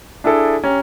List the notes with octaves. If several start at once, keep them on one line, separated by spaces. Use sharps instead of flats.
D4 E4 G#4 A4
C#4 G4 A#5